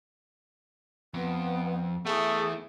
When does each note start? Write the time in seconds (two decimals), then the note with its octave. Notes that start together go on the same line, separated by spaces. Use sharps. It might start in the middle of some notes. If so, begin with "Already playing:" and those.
1.14 F2 B3
2.06 A3 B3 E4 G#4